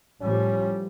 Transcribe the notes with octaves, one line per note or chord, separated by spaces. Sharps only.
A2 F3 G3 C#4